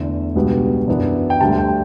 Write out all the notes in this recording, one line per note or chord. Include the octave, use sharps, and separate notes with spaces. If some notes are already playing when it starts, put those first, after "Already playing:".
Already playing: E2 D3 A3
C#2 B2 G3 B3 D4
F#2 E3 B3 D4
G5
D2 D3 G3 A5
G5